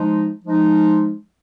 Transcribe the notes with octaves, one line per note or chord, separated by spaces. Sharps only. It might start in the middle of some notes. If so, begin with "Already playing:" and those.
Already playing: F3 G#3 D#4
F3 G#3 D#4